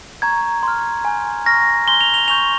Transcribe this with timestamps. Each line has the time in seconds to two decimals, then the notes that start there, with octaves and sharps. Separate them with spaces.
0.22 A#5 C#6 G6 G#6
0.63 C6 F6
1.05 G#5 C6 G6
1.46 A#5 C#6 F6 A#6
1.87 G#5 C6 G6 G7
2.01 F7
2.14 F7
2.28 G#5 C#6 G6 F7